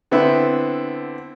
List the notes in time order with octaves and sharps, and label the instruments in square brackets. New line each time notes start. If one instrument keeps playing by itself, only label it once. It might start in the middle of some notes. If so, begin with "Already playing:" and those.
[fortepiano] D3 B3 C4 E4